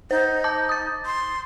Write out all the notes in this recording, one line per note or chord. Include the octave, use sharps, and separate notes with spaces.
D#4 C5
A5 D6 G6
D#6 A6
C6